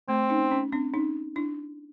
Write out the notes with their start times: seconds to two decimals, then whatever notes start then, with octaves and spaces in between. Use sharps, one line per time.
0.08 A3 C4
0.30 C#4 D#4
0.51 C#4
0.72 C4 D4
0.94 C#4 D#4
1.36 D4 E4